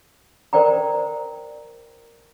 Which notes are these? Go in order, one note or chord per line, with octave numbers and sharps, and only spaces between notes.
A#4 C5 D5 G5 A#5